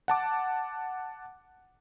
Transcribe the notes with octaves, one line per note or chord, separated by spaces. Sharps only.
F#5 A5 D6